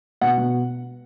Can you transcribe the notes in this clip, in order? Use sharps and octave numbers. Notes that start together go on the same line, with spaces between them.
B2 F#5
B2